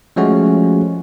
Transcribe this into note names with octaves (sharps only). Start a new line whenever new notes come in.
F3 G#3 A3 C#4 F#4